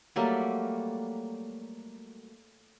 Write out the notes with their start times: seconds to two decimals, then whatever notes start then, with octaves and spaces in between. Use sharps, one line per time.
0.16 F#3 G3 A3 A#3